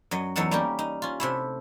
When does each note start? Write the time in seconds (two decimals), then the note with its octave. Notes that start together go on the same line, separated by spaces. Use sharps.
0.11 F#2 F#3 D#5
0.36 E2 F#3 D#4 A4 F#5
0.51 G3 A#3 C#4 D#4 G4
0.79 D#4
1.02 C#4 F4
1.20 C3 A3 E4